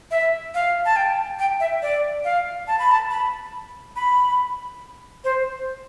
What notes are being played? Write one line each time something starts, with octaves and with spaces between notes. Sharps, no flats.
E5
F5
A5
G5
G5
E5
D5
F5
A5
B5
A5
B5
B5
C5